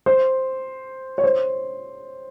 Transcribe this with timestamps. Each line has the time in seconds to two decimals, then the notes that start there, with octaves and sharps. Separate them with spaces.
0.06 C5
1.18 C#5
1.24 C5